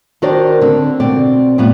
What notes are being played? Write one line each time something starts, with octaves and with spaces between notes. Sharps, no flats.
D#3 D4 F#4 A#4 C5 D5
D3 C4
B2 C4 D5
A2 G3 B3 F4